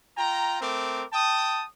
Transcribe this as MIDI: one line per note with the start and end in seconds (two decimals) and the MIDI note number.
0.17 0.61 65
0.17 0.61 79
0.17 0.61 82
0.61 1.04 57
0.61 1.04 60
0.61 1.04 70
0.61 1.04 86
1.13 1.65 79
1.13 1.65 81
1.13 1.65 87